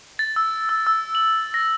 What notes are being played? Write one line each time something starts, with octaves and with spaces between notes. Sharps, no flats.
A6
E6
E6
E6
F#7
A#6